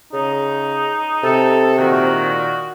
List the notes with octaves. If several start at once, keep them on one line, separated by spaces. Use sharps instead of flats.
C#3 D#4
C3 A4
A#2 D#3 F#4